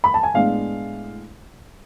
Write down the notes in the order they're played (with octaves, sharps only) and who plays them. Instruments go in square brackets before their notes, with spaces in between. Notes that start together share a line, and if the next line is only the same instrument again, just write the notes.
[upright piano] B5
A5
G#5
A2 G#3 B3 D4 F5